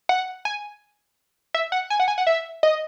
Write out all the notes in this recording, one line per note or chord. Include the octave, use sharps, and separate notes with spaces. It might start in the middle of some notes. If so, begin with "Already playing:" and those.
F#5
G#5
E5
F#5
G#5
F#5
G#5
F#5
E5
D#5